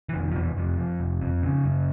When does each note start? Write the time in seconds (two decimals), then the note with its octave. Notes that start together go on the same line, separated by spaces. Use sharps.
0.09 E3
0.14 F1 D#3
0.32 F3
0.35 F1 E2 E3
0.57 F1 F2 F3
0.78 F2
1.00 F1
1.21 F2
1.43 C#3
1.65 F#2